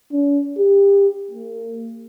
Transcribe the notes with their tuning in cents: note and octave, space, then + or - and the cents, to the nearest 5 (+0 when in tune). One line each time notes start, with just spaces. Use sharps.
C#4 +45
G4 +25
A#3 -35